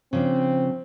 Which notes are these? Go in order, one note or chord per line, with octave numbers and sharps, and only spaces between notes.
C#3 F3 C4 D4